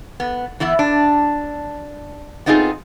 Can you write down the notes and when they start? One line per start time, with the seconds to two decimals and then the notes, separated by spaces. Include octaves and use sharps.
0.20 B3
0.60 E3 B3 E4
0.79 D4
2.46 B3 C4 D#4 F4 G4 G#4